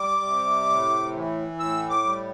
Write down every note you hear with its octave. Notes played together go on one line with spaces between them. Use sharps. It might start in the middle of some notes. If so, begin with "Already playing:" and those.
Already playing: G3 D6
C3
A2
E3
A2 E6
D6
G3